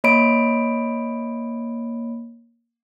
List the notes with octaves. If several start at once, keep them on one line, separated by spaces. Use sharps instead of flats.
A#3 C#5 D#5 B5 D7